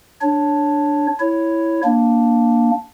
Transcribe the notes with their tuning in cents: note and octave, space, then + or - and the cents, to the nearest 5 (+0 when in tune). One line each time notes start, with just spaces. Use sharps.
D4 +0 C#5 +0
E4 +0 C#5 +0
A#3 +10 D4 +0